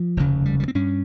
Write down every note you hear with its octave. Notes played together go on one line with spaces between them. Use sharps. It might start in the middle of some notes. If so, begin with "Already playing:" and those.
Already playing: F3
F1 D#2 C#3
G3
G3
C4
G2 C#4